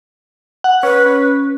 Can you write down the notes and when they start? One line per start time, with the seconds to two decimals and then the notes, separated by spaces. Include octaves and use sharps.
0.64 F#5
0.83 C#4 B4
1.06 C#4